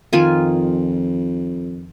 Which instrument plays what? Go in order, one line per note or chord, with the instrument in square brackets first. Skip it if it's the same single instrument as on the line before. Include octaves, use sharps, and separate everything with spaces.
[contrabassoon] F2 [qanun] D#3 F4 G#5